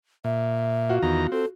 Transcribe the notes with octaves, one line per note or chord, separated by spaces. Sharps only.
A#2 E5
F4 F#4
E2 D#3 B3 A#5
C4 A4